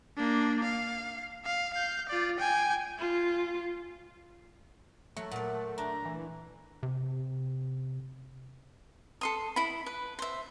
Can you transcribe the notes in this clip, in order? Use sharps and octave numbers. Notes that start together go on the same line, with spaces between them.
A#3 D4
F5
F5
F5 G6
F4 D5
G5 G#5
F4
F#3 A3
A#2 D5 F#5
D4 A#5
E3
C3
A4 C6 D#6
E4 B5
B4
C5 E5